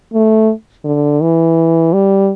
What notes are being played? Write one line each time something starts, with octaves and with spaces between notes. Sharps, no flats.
A3
D3
E3
G3